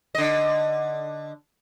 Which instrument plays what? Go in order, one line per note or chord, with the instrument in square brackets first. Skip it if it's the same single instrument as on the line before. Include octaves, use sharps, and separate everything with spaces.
[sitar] D3 D#5